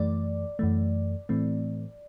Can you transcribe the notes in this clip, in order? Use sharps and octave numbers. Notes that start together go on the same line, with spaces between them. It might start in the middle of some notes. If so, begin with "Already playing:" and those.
Already playing: F#2 E3 A3 D5
F#2 E3 A3
A2 E3 A3 C4